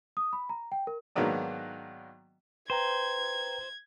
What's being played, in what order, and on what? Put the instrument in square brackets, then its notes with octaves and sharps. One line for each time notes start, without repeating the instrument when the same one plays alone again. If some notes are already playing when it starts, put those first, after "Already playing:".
[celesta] D#6
B5
A#5
G5
A#4
[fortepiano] G#2 D#3 F#3 A#3 B3 D4
[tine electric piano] B4 G5 A#5 [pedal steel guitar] C5 [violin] G#6